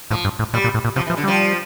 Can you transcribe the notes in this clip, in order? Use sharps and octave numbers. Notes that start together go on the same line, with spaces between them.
A2 F3
G2
A2
A#2 G3
A#2
A2
A#2
C3 F3
E3
F3
D3
F3 G3